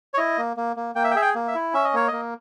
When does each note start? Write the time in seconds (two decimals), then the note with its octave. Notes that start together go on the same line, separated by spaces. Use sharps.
0.14 C#5
0.18 E4 D#5
0.38 A#3
0.57 A#3
0.76 A#3
0.95 A#3 G5
1.04 E5
1.11 G5
1.15 G#4 E5
1.22 G5
1.35 A#3
1.48 E5
1.55 E4
1.74 C#4 E5
1.84 D#5
1.94 A#3 C#5
2.08 A#3 D#5